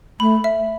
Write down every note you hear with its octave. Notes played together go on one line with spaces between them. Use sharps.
A3 B5
E5